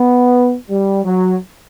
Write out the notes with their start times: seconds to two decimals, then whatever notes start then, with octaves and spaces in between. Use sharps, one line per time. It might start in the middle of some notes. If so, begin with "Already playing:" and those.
Already playing: B3
0.70 G3
1.04 F#3